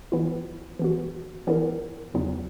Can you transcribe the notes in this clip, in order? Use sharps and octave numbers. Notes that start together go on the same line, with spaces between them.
E3 B3 E4
E3 B3 F#4
E3 B3 E4 A#4
E2 C#3 F#3 B3 D#4